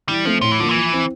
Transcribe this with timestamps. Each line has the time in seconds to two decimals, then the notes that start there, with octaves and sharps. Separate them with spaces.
0.08 E3 G3
0.25 F3 A3 C4
0.41 A2 F3
0.51 E3
0.59 D3 F3 A#3
0.69 E3
0.75 F3
0.92 C4 E4